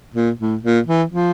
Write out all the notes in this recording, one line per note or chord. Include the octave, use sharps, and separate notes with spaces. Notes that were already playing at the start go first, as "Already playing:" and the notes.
A#2
A2
A#2
E3
F3